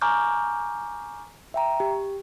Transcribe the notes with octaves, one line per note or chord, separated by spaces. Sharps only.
G#5 A#5 C#6 D6 F6 G6
E5 G5 A#5
G4